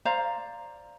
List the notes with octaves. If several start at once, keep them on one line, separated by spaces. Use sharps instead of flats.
C5 D5 F5 A#5